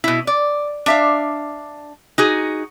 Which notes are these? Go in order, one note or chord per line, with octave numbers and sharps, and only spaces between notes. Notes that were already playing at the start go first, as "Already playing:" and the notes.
B2 E4
D5
D4 E5 F5
D#4 F#4 G#4